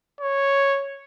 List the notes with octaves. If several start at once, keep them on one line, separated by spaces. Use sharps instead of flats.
C#5